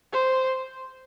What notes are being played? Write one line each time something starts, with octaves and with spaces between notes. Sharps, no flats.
C5